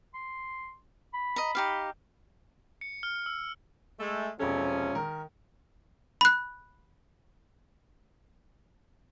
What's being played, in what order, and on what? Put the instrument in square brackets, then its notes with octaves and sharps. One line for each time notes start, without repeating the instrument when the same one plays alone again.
[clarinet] C6
B5
[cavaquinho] D#5 A#5
D#4 G4 F5
[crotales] C#7
F6
E6
[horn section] G#3 A3
[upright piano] E1 A4 [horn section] C3 F3 C#4
[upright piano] D#3 A#4
[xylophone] B5 F#6